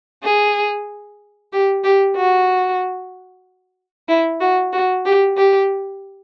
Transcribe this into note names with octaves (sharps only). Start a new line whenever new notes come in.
G#4
G4
G4
F#4
E4
F#4
F#4
G4
G4